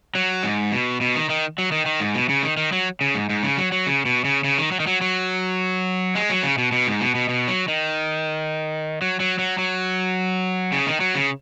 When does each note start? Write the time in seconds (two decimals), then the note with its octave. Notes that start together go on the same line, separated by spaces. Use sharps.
0.15 F#3
0.43 G#2
0.72 B2
1.01 B2
1.15 D#3
1.29 D#3
1.58 F#3
1.72 D#3
1.86 D#3
2.00 G#2
2.14 B2
2.29 C#3
2.43 D#3
2.57 D#3
2.72 F#3
3.01 C#3
3.14 G#2
3.29 G#2
3.43 C#3
3.58 F#3
3.72 F#3
3.87 C#3
4.05 B2
4.25 C#3
4.44 C#3
4.58 D#3
4.72 F#3
4.80 D#3
4.87 F#3
5.01 F#3
6.15 G#3
6.29 F#3
6.43 C#3
6.58 B2
6.72 B2
6.87 G#2
7.01 B2
7.15 B2
7.29 B2
7.48 F#3
7.68 D#3
9.02 F#3
9.20 F#3
9.39 F#3
9.58 F#3
10.72 C#3
10.87 D#3
11.00 F#3
11.15 C#3